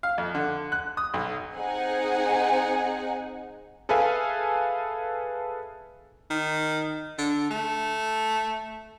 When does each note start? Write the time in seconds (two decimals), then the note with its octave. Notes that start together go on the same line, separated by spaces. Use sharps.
0.03 F5
0.18 F2
0.35 D3
0.72 F#6
0.97 D#6
1.14 B1
1.56 C4 D#4 G#4 F#5 G#5
3.89 G#4 A4 B4 E5 F5 G#5
6.31 D#3
7.19 D3
7.51 A3